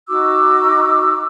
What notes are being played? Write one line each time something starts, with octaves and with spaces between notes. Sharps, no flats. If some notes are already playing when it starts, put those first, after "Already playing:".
D#4 F#4 D6 E6